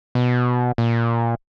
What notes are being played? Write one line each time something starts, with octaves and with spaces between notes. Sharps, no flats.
B2
A#2